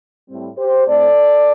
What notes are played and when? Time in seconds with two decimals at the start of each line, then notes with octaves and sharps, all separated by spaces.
0.28 A2 G3 C4
0.57 G4 C5
0.87 A2 A3 C4 A4 D5